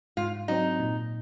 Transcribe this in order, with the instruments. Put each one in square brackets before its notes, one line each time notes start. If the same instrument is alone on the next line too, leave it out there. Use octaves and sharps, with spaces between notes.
[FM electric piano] G#2 [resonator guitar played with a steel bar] F4
[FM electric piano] F#3 C4 [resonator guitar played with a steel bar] D#4
[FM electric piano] A#2